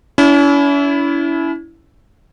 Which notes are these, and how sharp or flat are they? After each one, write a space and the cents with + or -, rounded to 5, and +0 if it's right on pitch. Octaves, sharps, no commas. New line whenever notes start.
C#4 +45 E4 +0